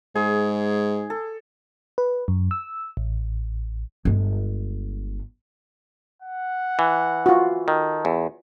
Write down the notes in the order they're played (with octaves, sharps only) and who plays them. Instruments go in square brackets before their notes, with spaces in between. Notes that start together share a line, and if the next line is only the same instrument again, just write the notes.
[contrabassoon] G#2 [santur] G#4
[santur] A4
[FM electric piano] B4
F#2
E6
A1
[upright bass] G1 G#3
[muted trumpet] F#5
[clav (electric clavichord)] E3
[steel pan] F4 F#4
[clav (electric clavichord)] D#3 [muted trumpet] A4
[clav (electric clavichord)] E2